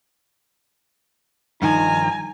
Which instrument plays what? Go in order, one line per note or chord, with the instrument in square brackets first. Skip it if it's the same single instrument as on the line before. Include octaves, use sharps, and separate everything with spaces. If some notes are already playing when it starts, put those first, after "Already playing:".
[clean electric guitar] G2 D#3 F3 [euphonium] D#4 [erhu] G#5 [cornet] A#5